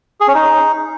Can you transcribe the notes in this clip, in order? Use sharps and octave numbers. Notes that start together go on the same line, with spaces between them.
G#4
C#4
D#4